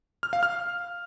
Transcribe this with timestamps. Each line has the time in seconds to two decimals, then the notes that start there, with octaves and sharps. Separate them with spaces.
0.23 F6
0.33 F5
0.43 F6